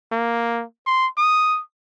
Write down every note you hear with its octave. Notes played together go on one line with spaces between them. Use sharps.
A#3
C6
D#6